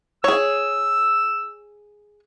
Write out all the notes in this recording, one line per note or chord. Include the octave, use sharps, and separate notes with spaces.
G#4 C#5 E6